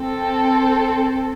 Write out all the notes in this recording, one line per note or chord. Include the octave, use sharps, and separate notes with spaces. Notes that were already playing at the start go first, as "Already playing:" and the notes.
Already playing: C4 A4